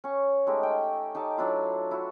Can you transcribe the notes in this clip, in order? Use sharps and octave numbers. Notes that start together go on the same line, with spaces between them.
C#4 C#6
G#3 A3 D#4 G4
G5
D#4 G4 A4 A5
F#3 D4 E4 F4
E4 F#4